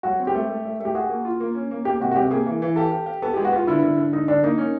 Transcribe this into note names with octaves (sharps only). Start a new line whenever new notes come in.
F#3 F#4
C4
G4
A3
A3
A3
A3 G4
F#4 G#4
A#3
F4
A#3
C#4
A#3
A#3 G4
C3 F#4
F#4
C3 G4
A#3 G#4
E3
E3
G4 A4
G4
G4
B3 A4
G#3 G4
F#4
B3 F4
D3 E4
D3
D3
D3 D#4
D3 D4
A#3 D#4
C#4